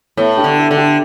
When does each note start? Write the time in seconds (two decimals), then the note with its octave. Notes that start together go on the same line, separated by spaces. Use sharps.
0.17 A2 B3 E4
0.37 D4 G4
0.44 D3
0.57 E4 A4
0.71 D3
0.77 D4 G4